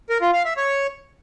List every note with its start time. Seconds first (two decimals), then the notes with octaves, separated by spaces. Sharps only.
0.10 A#4
0.22 F4
0.33 F5
0.45 E5
0.57 C#5